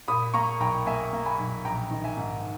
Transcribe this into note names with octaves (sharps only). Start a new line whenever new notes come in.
A#2 B5 D#6
A#3 A#5 C#6
B1 G5 A#5
A#3 E5 G#5
A#3
G#5 B5
B1
A#1 G5 A#5
D#3
E5 G#5
G#2